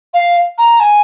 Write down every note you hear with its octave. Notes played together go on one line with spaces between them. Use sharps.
F5
A#5
G#5